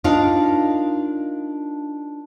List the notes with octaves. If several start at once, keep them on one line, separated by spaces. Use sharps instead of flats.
D4 D#4 F4 A#4 F5